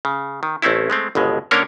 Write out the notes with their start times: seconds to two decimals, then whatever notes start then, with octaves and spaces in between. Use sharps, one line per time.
0.05 C#3
0.43 D#3
0.62 A1 A3 C4 C#4 E4
0.90 G#3 A3 C4
1.15 G1 C#2 B2 G#3
1.51 D3 A#3 C#4 D4 A#4 C#5